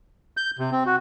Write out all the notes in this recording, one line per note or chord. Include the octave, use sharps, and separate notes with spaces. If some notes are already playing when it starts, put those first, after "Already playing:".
G6
C3
C4
F#4